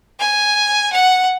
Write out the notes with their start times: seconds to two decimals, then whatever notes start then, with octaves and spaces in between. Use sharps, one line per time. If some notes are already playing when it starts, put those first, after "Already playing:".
0.19 G#5
0.92 F#5